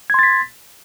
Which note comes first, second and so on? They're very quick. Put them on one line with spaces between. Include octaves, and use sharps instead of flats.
G#6 C6 A6 B6